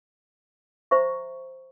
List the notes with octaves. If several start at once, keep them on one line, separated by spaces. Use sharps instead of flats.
C5 E5 A#5 C#6